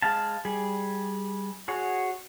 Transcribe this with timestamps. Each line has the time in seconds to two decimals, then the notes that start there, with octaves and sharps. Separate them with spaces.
0.02 G#3 F5 A5
0.45 G3 G#4
1.68 F#4 G#4 C#5